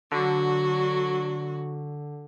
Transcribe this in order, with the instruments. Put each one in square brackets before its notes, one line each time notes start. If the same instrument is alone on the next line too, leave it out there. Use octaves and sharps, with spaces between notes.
[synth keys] D3 [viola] F#3 F#4